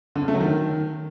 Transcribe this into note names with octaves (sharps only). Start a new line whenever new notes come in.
D3
C#3
A3
F#3
D#3